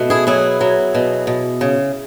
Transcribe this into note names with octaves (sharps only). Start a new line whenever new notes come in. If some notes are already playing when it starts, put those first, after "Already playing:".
Already playing: B2 A3
E4 G#4
F#3 E4 G#4
F#3
B2
B2
C#3